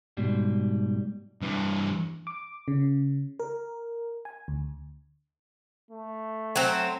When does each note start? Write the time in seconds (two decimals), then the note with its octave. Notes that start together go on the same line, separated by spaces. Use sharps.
0.17 G#2 B2 G3
1.41 G2 E3
2.27 D6
2.68 C#3
3.40 A#4
4.25 G#5
4.48 D2
5.91 A3
6.56 F#3 C4